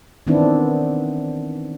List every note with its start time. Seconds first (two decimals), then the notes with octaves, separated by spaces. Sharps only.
0.27 D#3 E3 B3 C4 D4 E4